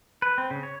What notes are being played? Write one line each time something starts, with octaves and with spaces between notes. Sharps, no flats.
B4
C4
C#3
C#5